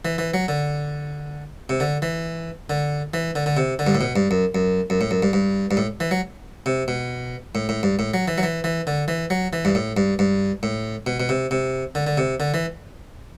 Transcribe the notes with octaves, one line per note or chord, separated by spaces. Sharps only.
E3
E3
F#3
D3
C3
D3
E3
D3
E3
D3
D3
C3
D3
G2
A2
B2
G2
F#2
F#2
F#2
A2
F#2
G2
G2
G2
A2
E3
F#3
C3
B2
A2
A2
G2
A2
F#3
E3
F#3
E3
E3
D3
E3
F#3
E3
G2
A2
G2
G2
A2
B2
B2
C3
C3
D3
D3
C3
D3
E3